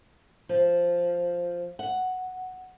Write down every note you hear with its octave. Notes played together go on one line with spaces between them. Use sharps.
F3
F#5